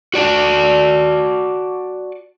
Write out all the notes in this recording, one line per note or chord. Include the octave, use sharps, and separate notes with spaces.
F#4 D5 A5